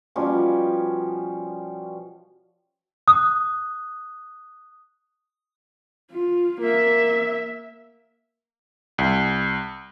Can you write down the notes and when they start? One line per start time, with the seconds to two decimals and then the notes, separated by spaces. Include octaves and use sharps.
0.16 B2 F3 G3 C#4
3.07 D#6 F#6
6.11 F4
6.60 A#3 E5
8.98 C2